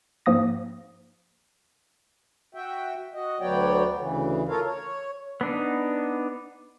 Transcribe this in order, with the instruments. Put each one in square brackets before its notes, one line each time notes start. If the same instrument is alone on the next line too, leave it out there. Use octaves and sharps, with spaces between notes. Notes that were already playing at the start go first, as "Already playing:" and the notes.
[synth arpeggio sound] G#2 F3 A#3 D#6 A#6
[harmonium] F#4 E5 G5
F#4 D#5
D2 F#3 B3 C#5 D5 G5
D2 C#3 E3
F4 A4 A#4 C#5 F5
C#5
[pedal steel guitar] B3 D4 D#4